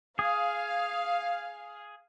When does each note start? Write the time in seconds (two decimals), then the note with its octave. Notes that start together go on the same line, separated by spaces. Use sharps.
0.19 G#4 F5